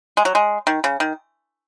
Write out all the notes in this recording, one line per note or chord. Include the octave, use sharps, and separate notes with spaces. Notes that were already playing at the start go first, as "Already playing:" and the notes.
G#3
F#3
G#3
D#3
C#3
D#3